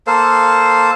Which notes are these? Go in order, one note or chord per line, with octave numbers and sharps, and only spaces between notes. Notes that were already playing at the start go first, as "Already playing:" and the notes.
A#3 A4 C5 F5